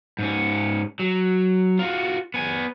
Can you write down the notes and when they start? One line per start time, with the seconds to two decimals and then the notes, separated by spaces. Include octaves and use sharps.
0.19 G#2 C#4
0.99 F#3
1.79 F4 F#4
2.34 B3 G#5